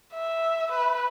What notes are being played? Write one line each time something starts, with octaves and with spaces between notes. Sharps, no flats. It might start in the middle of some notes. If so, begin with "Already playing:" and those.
E5
B4